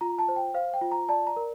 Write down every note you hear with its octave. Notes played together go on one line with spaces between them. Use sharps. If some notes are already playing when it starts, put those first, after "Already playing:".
F4 A#5
A5
C5
G5
C5 F5
G5
F4
A#5
D5 A5
A#5
A#4